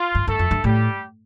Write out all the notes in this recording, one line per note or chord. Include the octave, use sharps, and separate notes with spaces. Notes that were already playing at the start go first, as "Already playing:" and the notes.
Already playing: F4
G2
G2 A3 A4
F2
G2
A2 G3 G4